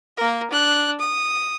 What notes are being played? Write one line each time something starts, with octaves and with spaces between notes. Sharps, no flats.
A#3 A#4
D4 F#6
D#6